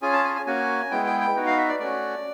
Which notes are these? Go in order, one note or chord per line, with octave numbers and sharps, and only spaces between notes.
C#4 F4 G#4 G#5
A5
G#5
G#5
A#3 C#4 F#4 G#5
G#3 B3 E4 G5
G5
G5
B3 D#4 F#4
F5
E5
D5
A3 C#4 F#4 D5